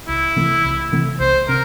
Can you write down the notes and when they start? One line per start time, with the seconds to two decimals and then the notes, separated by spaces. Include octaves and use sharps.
0.08 C2 E4
0.36 C3 E3 A3
0.65 C2
0.92 C3 E3 A3
1.20 C2 C5
1.49 C3 A#4